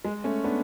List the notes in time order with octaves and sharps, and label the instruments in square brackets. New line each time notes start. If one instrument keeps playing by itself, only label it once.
[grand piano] G#3
A3 C#4
B3 D4